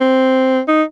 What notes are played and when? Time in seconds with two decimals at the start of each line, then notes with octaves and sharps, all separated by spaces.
0.01 C4
0.68 D#4